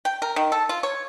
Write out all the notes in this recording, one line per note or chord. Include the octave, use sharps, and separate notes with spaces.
G5
A#4
D#3
A4
F4
C#5